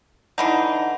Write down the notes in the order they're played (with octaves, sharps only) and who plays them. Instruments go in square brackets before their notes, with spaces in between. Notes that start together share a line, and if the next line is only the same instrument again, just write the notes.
[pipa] D3 E3 D#4 [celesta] F#5 B5